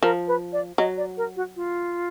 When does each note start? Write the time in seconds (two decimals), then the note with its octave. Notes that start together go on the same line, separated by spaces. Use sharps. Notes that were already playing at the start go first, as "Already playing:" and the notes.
0.02 F3 A#4
0.28 B4
0.53 D5
0.78 F#3 D#5
0.97 D5
1.17 A#4
1.36 F#4
1.56 F4